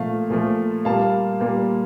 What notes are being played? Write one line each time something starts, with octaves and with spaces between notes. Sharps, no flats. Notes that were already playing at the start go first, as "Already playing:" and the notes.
Already playing: A#2 F3 A3 F5 A5
A#2 F3 A3
A#2 G3 A#3 F5 A5
A#2 G3 A#3